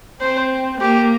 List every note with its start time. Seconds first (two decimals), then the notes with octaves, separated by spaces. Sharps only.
0.21 C4 C5
0.81 A#3 G4